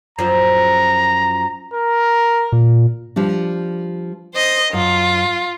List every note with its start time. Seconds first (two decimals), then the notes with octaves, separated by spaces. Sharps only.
0.19 F#2 F3 A#5
1.74 A#4
2.52 A#2
3.16 F3 G3 D4
4.34 C5 D#5
4.73 F#2 F4